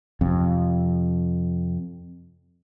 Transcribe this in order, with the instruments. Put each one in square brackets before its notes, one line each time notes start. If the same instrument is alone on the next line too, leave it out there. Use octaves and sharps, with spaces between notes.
[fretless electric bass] F2 C3